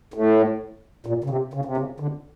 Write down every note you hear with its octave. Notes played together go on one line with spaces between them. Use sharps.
A2
A#2
C#3
C3
C#3
C3
C#3
D3